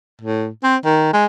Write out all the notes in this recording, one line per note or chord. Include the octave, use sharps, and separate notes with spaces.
A2
C4
D#3
G#3